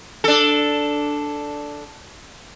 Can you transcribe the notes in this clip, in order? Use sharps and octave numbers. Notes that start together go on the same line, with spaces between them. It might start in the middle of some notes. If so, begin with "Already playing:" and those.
D4 A4